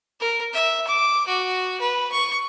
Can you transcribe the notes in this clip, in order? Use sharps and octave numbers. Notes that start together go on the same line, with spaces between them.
A#4
E5
D6
F#4
B4
C#6